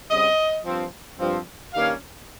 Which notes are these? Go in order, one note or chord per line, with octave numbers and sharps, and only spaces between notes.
C#3 G3 C4 D#5
G2 F3 C4
G2 F3 C4
G2 D#3 G3 A#3 C#4 F5